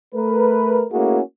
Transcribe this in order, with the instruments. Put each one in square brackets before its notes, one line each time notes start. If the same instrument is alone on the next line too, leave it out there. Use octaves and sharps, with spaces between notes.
[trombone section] A3 A#4 B4
A3 A#3 C#4 E4 F#4 G#4